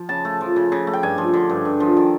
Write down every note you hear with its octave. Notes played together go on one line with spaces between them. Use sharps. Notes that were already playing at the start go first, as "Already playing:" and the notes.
Already playing: F3
C#3 A5
A3
F3
C#3
C#3
A3
G5
G2 G#5
F3
D3
G2
G2
F3
D#3